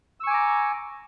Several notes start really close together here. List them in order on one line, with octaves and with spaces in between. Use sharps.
E6 C#6 G#5 D6 A#5